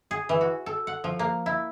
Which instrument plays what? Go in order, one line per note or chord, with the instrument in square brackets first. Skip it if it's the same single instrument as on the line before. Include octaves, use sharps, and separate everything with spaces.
[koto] G#4
E3
F#4
A4
F#5
F3
A#3
E4